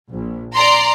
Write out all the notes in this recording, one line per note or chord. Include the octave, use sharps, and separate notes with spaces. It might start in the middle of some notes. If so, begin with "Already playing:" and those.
A#1
D5 A#5 C6